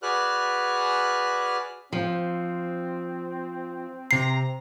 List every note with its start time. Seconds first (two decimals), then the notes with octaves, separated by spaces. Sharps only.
0.02 F#4 G#4 B4 D5 F6 F#6
1.92 F3 C4
4.11 C3 A#5 C7